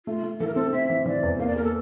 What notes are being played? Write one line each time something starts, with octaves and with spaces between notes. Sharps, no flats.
A3 F4
A3
E3 A4
A#4
C4 A4
C4 E5
E3
E3 D5
E2
A#3 F5
D5
A#3 A#4
A4